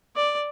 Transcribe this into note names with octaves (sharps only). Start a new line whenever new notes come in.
D5